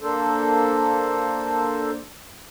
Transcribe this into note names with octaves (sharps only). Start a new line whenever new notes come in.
A#3 D4 A4 C5